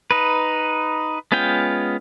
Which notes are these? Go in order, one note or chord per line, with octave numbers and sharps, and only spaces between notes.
D#4 B4
G#3 B3 C#4 F4 G5